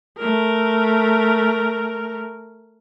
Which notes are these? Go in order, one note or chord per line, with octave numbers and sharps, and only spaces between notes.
A3 A#4